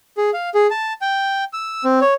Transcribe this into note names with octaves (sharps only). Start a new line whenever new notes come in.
G#4
F5
G#4
A5
G5
E6
C4
C#5